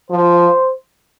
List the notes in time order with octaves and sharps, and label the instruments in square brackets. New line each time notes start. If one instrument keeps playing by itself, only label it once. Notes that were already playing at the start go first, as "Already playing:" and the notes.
[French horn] F3 [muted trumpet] C5